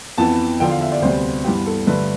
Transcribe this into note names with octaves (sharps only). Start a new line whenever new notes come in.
F2 E3 B3 A5
E2 D3 F3 G5
F5
E5
D5
D2 C3 G3 B3 C5
G2 E3 B3 G4
A4
G2 D3 A3 B4